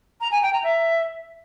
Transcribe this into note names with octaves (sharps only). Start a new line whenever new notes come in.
A#5
G#5
G5
A#5
E5